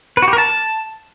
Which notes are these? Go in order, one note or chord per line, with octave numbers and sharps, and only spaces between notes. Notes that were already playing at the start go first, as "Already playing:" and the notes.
B4
F#4
G4
A#4
A5